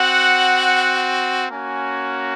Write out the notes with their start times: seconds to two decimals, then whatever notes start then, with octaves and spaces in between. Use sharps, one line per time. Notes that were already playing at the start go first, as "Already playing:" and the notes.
Already playing: C4 F#4 F#5
1.51 A#3 C#4 F#4 G#5